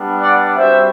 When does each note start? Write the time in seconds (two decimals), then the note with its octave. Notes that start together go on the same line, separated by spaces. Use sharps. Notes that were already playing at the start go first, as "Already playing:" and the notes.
Already playing: G3 B3 D4
0.21 D5 F#5
0.57 G3 C4 F#4 C5 E5